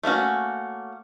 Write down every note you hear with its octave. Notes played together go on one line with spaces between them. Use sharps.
A3 A#3 C#4 F#4